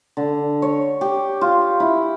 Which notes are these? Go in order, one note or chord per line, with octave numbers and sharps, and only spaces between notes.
D3
C#5
G4
F4
E4